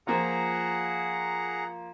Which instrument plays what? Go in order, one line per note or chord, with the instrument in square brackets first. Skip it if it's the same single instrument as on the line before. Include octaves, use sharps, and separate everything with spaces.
[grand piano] F3 A#3 F4 [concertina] G#4 F#5 A#5